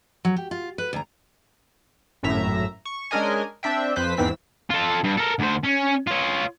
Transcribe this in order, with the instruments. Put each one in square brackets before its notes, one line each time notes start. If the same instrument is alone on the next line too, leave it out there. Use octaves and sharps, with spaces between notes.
[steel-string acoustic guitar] F#3
G4
F4
B4
D2 A#5
[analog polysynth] G#1 F#2 A2 E5 A#5
C#6
G#3 C#4 D4 A#4 D#5 G#5
C4 D4 E5 G5
F2 B4 C5 B6
E2 G#2 E3 C4 E6 B6
[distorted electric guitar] F4 A4
G2
A4 A#4
D2 C5
C#4
F4 C#5